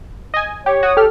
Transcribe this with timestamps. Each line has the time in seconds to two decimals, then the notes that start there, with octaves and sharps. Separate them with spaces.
0.34 D#5 G#5
0.66 G4 C#5
0.83 F#4 D#6
0.97 G4 A4 F6